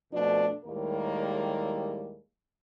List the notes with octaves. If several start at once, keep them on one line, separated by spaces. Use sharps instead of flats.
F2 B2 F3 A3 D4
D#2 A2 G3 G#3 A#3 A#4